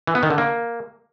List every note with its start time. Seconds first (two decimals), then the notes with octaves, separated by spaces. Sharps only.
0.07 E3
0.15 B3
0.23 D#3
0.30 D3
0.38 A#3